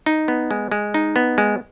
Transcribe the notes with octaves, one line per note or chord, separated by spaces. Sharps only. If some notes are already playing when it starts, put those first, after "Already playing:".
D#4
B3
G#3
G#3
D#4
B3
G#3